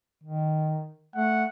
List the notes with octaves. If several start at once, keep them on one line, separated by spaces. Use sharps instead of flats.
D#3
A3 F#5